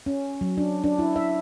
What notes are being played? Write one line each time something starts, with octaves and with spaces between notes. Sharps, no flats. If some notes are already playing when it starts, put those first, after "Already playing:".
C#4
F#3
D4
D4
E4
E5